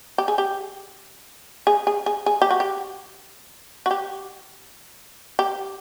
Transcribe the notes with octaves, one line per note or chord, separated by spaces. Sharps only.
G4
G#4
G4
G#4
G#4
G#4
G#4
G4
F#4
G4
F#4
G4
G4